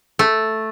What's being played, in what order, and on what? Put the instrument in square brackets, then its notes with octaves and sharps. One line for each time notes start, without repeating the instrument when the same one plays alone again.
[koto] A3